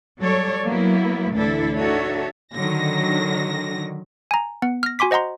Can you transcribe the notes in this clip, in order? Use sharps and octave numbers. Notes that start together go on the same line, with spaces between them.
F#3 G3 A4 C#5 D5
F#3 A#3 B3 E4
D2 A2 E3 D4 E4 A4
D4 D#4 F#4 A4 C#5 E5
D3 D#3 F#3 A#6
G#5 A#5
B3 F#5
F6 A#6
F#4 G#5 C6 D6 B6
C5 D#5 F#5 A#5 C6